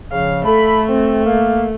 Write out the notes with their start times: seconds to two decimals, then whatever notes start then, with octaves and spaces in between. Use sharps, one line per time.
0.12 C#3 F3 F5
0.45 A3 A4 B5
0.89 C4
1.26 A#3 F5